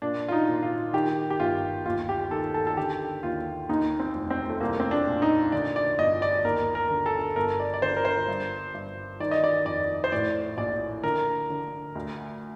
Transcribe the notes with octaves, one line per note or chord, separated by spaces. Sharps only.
A#2 D4
F4
D#4
A#2
F4
D#3 G4
G4
G1 F4
D#2 F4
G4
D#3 A4
A4
A4
D3 G4
D#2 F4
D#2 D#4
C4
F1
C4
A3
C2 A#3
C4
D4
A#2
D#4
D3 D5
D5
G1 D#5
D5
D#2 A#4
A#4
D3
A4
G1 A#4
D5
D5
D3 C5
A#4
C5
G2
G2
D#3 D5
D#5
D5
F2 D5
C5
A2 D5
A#1 D5
D3 A#4
D3
D2